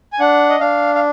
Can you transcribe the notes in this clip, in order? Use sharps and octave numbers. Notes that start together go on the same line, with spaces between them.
G#5
D4 F#5
D#5
D4 F5
F5